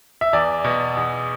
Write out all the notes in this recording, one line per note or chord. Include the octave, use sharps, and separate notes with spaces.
E5
E2 D5
B2
E2